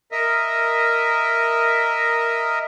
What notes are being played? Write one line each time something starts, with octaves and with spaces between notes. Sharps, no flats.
A#4 D#5 E5